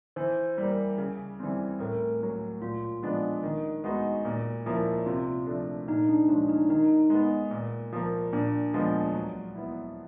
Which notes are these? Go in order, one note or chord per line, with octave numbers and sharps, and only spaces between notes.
E3 C5
G3 A#3
C#3
E3 G3 C4
A2 A#4
F#3 A#3
A#2 F4
F3 G#3 B3 D4
D#3
G#3 B3 D#4 F#4
A#2
F3 A#3 C#4 E4
C3 F4
F3 A3 D4
A#2 D#4
D4
F3 G#3 C#4 D4
D#4
D#3 D#4
G#3 B3
A#2
F3 A#3
A#2 D4
F3 G#3 B3
F#3
B3 E4